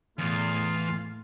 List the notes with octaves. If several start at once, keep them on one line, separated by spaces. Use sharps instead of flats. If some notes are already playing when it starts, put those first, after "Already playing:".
E2 A2 F4